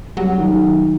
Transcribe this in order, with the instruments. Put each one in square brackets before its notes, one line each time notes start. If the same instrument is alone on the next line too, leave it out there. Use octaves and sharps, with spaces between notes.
[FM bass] F#3 [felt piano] G3 F#5
[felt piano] D#3